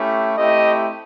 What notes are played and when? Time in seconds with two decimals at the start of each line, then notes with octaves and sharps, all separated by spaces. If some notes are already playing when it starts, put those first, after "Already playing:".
Already playing: A3 C#4 E4 G4
0.37 A3 C4 E4 G4 D#5